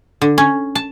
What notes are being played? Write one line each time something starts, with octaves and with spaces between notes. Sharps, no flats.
D3
C#4
A5